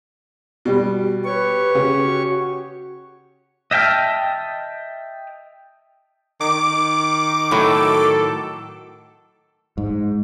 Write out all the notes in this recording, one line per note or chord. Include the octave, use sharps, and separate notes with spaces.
B2 G3
G4 B4 C#5 C#6
C#3 F#4
D#5 E5 G5 A5 F6
D#3 D6
A2 F#3 A4
G#2